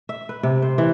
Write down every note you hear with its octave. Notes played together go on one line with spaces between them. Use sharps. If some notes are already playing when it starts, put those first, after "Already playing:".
E5
B4
C3
C5
E3